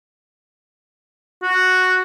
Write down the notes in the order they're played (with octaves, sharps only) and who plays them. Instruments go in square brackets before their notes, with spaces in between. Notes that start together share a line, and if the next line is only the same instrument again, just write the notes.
[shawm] F#4